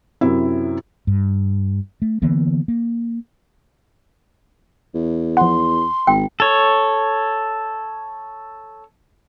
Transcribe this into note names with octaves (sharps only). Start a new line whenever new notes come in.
F#2 C3 C4 E4
G2
A3
D3 E3 A#3 B3
A#3
E2
F3 F#5 C6
G#1 G5
A4 C#5